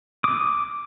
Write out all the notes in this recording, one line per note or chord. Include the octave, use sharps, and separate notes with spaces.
D6 D#6